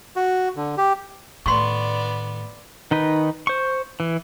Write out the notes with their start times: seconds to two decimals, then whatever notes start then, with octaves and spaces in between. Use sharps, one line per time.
0.16 F#4
0.56 D3
0.78 G4
1.46 A2 D#3 B3 D5 C6 C#6
2.91 D#3 D#4 B4
3.47 C5 C#6
4.00 E3